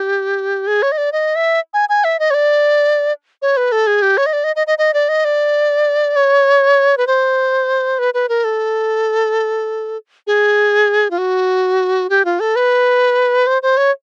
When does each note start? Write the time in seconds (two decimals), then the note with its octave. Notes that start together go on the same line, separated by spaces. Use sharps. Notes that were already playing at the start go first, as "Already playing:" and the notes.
Already playing: G4
0.67 G#4
0.82 C#5
0.92 D#5
0.98 D5
1.12 D#5
1.36 E5
1.74 G#5
1.89 G#5
2.04 E5
2.20 D#5
2.31 C#5
2.34 D5
3.42 C#5
3.57 B4
3.72 A4
3.87 G#4
4.02 G4
4.17 C#5
4.26 D#5
4.33 D5
4.44 D#5
4.56 D#5
4.67 D#5
4.78 D#5
4.94 D5
5.09 D#5
5.25 D5
6.16 C#5
6.97 B4
7.07 C5
7.99 B4
8.14 B4
8.29 A#4
8.44 A4
10.27 G#4
11.11 F4
11.18 F#4
12.10 G4
12.25 F4
12.40 A4
12.56 B4
13.47 C5
13.62 C5
13.77 C#5